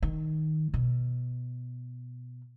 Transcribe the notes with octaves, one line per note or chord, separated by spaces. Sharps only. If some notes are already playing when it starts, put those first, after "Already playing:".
D#3
B2